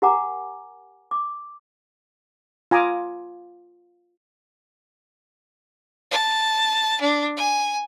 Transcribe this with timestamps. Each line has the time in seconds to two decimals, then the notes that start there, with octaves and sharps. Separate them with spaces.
0.02 G4 A#4 F#5 G#5 A#5 D6
1.11 D6
2.71 F4 G#5 A#5 D6 D#6
6.11 A5
7.01 D4
7.37 G#5